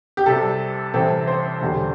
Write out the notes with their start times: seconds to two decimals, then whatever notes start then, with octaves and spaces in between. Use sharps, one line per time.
0.17 G4
0.26 C2 C3 G3 A4
0.94 C2 C3 E3 C4 E4 A4
1.27 C5
1.61 E1 E2 D3 G3